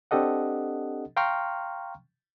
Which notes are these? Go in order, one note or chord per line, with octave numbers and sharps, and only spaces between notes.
C4 D4 G4 A4 D#5 F#5
F5 G5 A#5 C6 C#6 F6